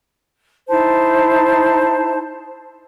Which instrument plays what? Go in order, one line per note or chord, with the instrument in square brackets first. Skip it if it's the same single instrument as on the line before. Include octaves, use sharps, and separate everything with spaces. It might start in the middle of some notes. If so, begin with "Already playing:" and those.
[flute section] D#4 E4 C5 A5